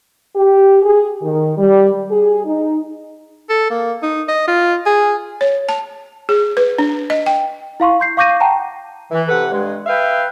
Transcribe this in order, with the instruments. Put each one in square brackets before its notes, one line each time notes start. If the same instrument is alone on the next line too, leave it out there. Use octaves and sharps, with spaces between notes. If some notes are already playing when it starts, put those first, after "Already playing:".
[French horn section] G4
G#4
D#3
G3
G#4
D#4
[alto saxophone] A4
A#3
D#4
D#5
F4
G#4
[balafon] C#5
A5
G#4
B4
D4
D#5
G5
[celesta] E4 F5 C6 C#6
C6 G6 C7
F5 C#6 D6 G6 A#6 D#7
F#5 G5 A5 A#5
[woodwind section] E3
C3 A4 B4 F#5
G2 G#3
B4 E5 F5 G5